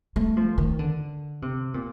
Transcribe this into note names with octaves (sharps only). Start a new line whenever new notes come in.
A3
F3
D#3
D3
C3
A#2